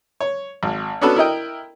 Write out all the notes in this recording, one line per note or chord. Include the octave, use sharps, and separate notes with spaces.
C#5
G#1
B3 C#4 D4 F#4 A4 B4
E4 A#4 D#5 G5